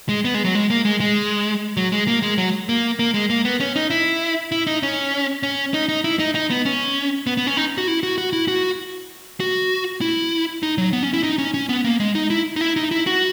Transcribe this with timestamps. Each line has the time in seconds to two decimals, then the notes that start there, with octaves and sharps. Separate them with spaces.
0.09 G#3
0.25 B3
0.34 G#3
0.45 F#3
0.55 G#3
0.70 A#3
0.85 G#3
1.00 G#3
1.77 F#3
1.92 G#3
2.07 A#3
2.23 G#3
2.38 F#3
2.69 A#3
2.99 A#3
3.14 G#3
3.30 A#3
3.45 B3
3.60 C#4
3.76 D#4
3.90 E4
4.52 E4
4.67 D#4
4.83 C#4
5.43 C#4
5.74 D#4
5.89 D#4
6.04 E4
6.19 D#4
6.35 D#4
6.50 B3
6.65 C#4
7.27 B3
7.37 B3
7.47 C#4
7.57 D#4
7.78 F#4
7.88 E4
8.03 F#4
8.18 F#4
8.33 E4
8.48 F#4
9.40 F#4
10.01 E4
10.63 D#4
10.78 F#3
10.93 B3
11.03 C#4
11.14 E4
11.23 D#4
11.38 C#4
11.54 C#4
11.69 B3
11.85 A#3
12.00 G#3
12.15 D#4
12.30 E4
12.56 D#4
12.61 E4
12.76 D#4
12.91 E4
13.07 F#4